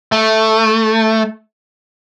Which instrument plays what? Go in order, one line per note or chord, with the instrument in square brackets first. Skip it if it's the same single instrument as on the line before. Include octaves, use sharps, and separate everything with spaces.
[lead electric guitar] A3